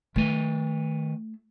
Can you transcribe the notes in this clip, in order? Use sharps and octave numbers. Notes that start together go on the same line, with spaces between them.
D#3 A3 B4